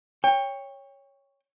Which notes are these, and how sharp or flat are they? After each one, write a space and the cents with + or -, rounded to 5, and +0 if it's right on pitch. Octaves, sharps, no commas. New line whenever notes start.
C#5 +0 G5 +25